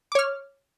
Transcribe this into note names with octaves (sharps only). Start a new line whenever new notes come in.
C#5 D6 F6